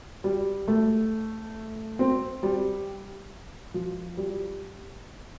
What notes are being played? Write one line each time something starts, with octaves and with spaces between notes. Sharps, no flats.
G3
A3
C4
G3
F3
G3